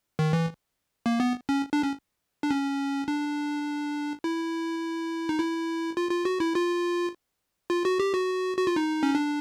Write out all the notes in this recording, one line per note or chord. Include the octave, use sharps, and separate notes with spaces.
D#3
E3
A#3
B3
C#4
D4
C#4
D4
C#4
D4
E4
D#4
E4
F4
F4
F#4
E4
F4
F4
F#4
G4
F#4
F#4
F4
D#4
C#4
D4